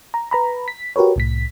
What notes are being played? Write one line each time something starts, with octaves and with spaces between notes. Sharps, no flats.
A#5
B4 A#5 B5
B6
F#4 G4 A#4 B4 C#5
C2 A2 B6